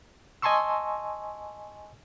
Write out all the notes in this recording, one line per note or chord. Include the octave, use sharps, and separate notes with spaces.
D#5 G#5 A5 C6 C#6 E6